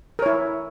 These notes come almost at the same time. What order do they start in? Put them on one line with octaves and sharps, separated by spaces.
A#4 C#5 E4